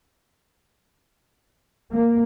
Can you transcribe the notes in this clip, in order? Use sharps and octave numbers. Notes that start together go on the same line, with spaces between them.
A#3